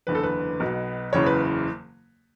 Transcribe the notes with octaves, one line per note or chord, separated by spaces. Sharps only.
F#1 E2 D3 B4
A4
B4
B1 B2
F#1 E2 C#3 E3 C#5
B4